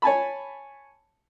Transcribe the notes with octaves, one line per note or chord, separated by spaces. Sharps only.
C#5 G#5 A5 B5